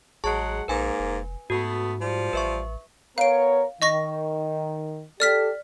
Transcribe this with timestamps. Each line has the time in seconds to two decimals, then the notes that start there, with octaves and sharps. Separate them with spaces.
0.24 A1 F#3 G#3 G#4 F#5 A5 C#6
0.68 A#1 G#2 A#3 B4 G#5
0.99 F1
1.50 G#2 A3 B3 F#4
2.00 F3 G3
2.33 A1 B4 E5 C#6
3.18 B3 A#4 C#5 F5 D7
3.82 D#3 D#5 C#6 A#6
5.20 G4 A4 D5 F6 B6